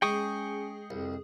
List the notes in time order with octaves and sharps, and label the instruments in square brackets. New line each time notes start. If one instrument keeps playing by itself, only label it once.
[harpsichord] G#3 [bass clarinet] C#4 [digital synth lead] G#4 [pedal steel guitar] G5 C#6 D#6
[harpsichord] C2 [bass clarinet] F2